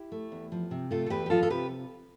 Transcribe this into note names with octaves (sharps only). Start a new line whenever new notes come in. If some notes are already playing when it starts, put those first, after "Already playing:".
Already playing: E4 G4
A3
E2
F3
C3
A3 F4 A4
A4
E2 G4 B4
G4
F3 F4 A4
A4
C3 G4 B4